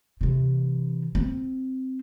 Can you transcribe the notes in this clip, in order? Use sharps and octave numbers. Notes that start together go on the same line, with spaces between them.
C3 E3
C4